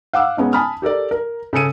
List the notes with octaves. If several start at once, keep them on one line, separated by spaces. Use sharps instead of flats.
F5 F#5 D6 E6 F6
G#3 B3 C#4 D#4
G#5 A5 B5 D#6 F6
G4 A4 A#4 D5
A#4
C#3 G#4 A4 C#7 D#7